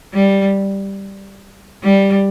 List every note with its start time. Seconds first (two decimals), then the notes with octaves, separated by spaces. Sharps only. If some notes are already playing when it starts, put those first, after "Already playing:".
0.14 G3
1.84 G3